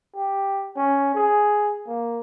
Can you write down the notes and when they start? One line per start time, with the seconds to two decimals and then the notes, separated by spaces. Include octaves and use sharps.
0.15 G4
0.76 C#4
1.15 G#4
1.87 A#3